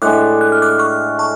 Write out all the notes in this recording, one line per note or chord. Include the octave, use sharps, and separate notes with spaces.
A2 G#3 D4 D6 F#6
F#6
F6
D6 F#6
C#6 F6
A5 C#6